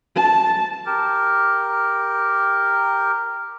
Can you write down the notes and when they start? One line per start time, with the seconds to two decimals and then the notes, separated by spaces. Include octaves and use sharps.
0.16 A5
0.86 G4 A#4